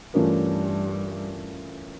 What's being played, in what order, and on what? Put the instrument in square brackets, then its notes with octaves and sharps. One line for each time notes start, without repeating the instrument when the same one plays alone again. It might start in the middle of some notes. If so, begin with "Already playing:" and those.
[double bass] G2 [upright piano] E3 A3 C#4 F4 A#4